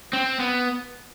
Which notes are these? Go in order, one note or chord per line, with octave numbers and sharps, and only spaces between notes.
C4
B3